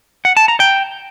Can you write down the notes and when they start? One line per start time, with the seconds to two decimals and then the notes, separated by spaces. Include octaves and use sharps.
0.25 F#5
0.37 A5
0.48 A#5
0.60 G5